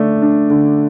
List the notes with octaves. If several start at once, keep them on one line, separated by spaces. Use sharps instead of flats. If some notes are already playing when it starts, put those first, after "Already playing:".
Already playing: D3 A3 D5
D4
D3